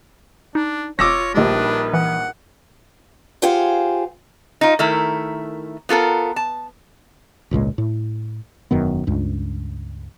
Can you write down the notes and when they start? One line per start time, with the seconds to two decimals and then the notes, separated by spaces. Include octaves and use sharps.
0.55 D4 D#4
0.99 E1 F4 C#5 D6 E6 A#6
1.34 A#1 D#3 G3 D4 B4
1.94 E3 F#5
3.42 F4 G4 G#4 C5 F5 F#5
4.61 D#4 F4
4.79 D#3 A3 E4 A#4
5.89 B3 F4 A4 A#4
6.36 A5
7.51 G#1 C#2 A#2 G#3
7.78 A2
8.71 E1 F#2 D#3 B3
9.07 C#2 G2